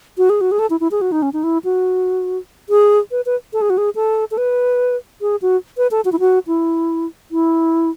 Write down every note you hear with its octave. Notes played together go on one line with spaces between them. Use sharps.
F#4
G#4
F#4
G#4
A4
E4
E4
G#4
F#4
D#4
C#4
D#4
E4
F#4
G#4
B4
B4
A4
G#4
F#4
G#4
A4
A4
B4
G#4
F#4
B4
A4
F#4
E4
F#4
E4
E4